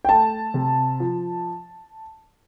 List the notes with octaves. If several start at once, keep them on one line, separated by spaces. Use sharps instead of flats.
G5
A3 A5
C3
F3